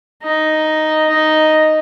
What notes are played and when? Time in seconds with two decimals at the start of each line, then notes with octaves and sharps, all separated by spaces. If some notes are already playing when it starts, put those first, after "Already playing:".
0.23 D#4
1.10 D#4